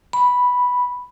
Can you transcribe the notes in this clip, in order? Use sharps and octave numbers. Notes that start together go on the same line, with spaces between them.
B5